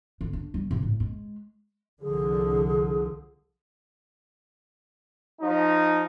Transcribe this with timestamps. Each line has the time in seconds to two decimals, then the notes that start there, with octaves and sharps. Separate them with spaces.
0.21 D3
0.33 D4
0.54 G3
0.71 C3
0.82 A2
1.00 G#3
2.02 C2 D3 F3 G#4
5.40 F3 D#4